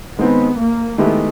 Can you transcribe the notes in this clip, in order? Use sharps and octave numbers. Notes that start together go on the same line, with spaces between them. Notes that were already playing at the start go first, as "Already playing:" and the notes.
D#3 G#3 B3 C4 D#4
A#3
D#3 G#3 A3 B3 E4 G4